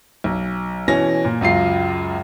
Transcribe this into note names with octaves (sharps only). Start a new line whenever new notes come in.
B1
B2 E3 C#4 A#6
A#2
C#2 F#2 F4 C7